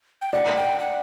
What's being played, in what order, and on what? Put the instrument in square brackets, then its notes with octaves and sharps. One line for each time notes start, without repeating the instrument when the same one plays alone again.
[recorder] G5
[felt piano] D5 [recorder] F#5
[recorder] G5
F#5